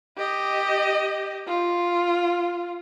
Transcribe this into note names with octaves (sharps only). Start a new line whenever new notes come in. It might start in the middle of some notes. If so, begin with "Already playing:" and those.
G4 D#5
F4